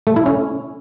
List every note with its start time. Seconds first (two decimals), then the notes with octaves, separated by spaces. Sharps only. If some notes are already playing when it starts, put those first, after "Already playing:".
0.07 A3
0.16 E4
0.26 C#4